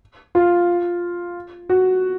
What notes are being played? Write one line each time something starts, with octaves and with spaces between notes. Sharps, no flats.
F4
F#4